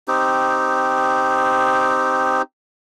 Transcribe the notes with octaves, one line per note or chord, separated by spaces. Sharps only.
C4 D#4 G4